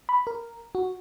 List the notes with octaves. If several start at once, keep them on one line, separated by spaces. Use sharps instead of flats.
B5
A#4
F#4